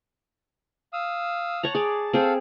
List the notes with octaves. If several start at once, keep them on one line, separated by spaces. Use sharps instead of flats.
F5 D#6 E6
C#5 F#5 A5 A#5
G#4 C#5 D5
C4 G#4 A4 C5 F5